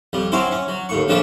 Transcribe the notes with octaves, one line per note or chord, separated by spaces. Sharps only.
F2 G3
F#3 C4 C#4 E4 C5
C#4
F#3
D#2 A2 C#6
A#1 C#3 F3 D4 A4 B5